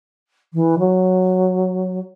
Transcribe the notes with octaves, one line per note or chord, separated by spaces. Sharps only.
E3
F#3